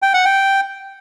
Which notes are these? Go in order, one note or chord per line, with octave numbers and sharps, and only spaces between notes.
G5
F#5
G5